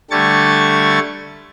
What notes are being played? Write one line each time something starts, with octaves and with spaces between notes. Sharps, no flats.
D3 G3 A3 C#6 G#6 A6